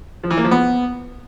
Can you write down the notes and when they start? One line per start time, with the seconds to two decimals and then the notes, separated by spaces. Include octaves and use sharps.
0.23 F3
0.30 E3
0.37 A#3
0.44 F3
0.51 B3